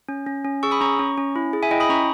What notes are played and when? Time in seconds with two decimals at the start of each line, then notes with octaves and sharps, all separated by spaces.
0.09 C#4
0.26 C#4
0.45 C#4
0.63 G#4 C#6 E6
0.71 B5 D#6
0.81 C#4 A#5 C#6
0.99 C#4
1.18 C#4
1.36 E4
1.53 G#4
1.63 E5 G#5
1.71 E4 D#5 G5
1.80 B5 D#6
1.89 C#4 A#5 C#6